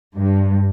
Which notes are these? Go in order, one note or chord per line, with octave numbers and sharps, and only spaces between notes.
G2